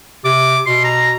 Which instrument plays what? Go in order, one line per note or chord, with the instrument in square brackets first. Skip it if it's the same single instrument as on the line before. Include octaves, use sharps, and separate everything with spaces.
[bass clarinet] C3 [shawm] D6
[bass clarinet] B2 [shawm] C6
[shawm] A#5